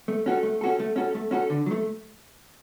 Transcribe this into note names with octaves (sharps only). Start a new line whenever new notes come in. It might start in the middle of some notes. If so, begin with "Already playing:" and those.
A3
C#4 F#4 A4
A3
C#4 F#4 A4
A3
C#4 F#4 A4
A3
C#4 F#4 A4
D3
F#3
A3